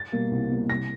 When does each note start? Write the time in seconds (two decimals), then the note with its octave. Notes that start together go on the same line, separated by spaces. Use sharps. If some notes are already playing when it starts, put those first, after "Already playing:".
Already playing: A6
0.12 B2 G3 A#3
0.31 C2
0.51 B2 G3 A#3
0.70 C2 A#6